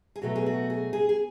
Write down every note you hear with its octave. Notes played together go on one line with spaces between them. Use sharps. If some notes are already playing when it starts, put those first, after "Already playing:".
G#4
B2 F#3 A3 F#4
G#4
F#4
G#4
G#4
G#4